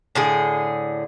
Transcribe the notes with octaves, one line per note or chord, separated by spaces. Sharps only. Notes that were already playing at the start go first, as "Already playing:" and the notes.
A2 D3 G#4